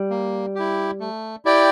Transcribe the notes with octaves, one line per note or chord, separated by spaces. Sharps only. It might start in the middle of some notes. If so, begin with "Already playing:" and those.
Already playing: G3
A#3
E4 G4
A3
E4 G4 D5 G5